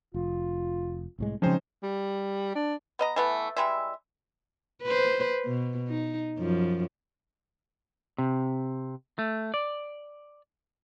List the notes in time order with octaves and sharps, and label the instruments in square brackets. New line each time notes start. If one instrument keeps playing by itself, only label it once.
[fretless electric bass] F1 [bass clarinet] F4
[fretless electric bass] C2 A2 G#3
[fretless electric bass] C#3 F#3 G#3 [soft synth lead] F3 [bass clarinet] C4 [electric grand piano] C#4 D#4 C5
[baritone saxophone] G3
D4
[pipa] B3 D#5 A#5
E3 A3 B3
E3 G3 G#3 E5
[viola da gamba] B4 C5
B2
D#4
F#2 F3
[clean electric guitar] C3
A3
D5